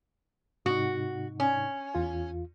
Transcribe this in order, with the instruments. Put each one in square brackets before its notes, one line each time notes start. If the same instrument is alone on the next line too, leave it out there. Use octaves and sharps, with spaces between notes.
[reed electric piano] G#2 C3 D#4 [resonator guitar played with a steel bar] F#4
[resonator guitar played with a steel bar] C#4
[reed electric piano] E2 F4